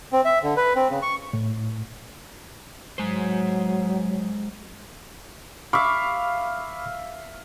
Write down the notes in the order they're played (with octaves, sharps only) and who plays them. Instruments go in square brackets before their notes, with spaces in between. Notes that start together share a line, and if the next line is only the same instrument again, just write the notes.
[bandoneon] C4
E5
D3
B4
C4
C#3
C#6
[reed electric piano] A2
[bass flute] F#3 [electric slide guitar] G#3 C5
[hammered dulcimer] E5 F5 [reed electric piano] B5 C#6 D6